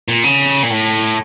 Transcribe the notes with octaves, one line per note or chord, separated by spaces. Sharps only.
A#2
C#3
A#2
A2